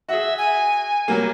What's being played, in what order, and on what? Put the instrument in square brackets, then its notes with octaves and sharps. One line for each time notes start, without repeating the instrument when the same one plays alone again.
[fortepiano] F#4 G#4 [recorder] E5
[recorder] G#5
[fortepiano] F#3 G3 A#3